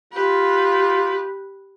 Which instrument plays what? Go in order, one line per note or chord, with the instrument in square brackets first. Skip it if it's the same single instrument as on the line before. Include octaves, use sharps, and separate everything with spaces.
[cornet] F4 [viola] G4 B4